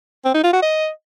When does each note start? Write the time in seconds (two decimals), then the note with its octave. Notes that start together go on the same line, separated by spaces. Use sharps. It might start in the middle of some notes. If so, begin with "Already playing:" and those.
0.25 C4
0.34 D#4
0.44 F4
0.53 F#4
0.62 D#5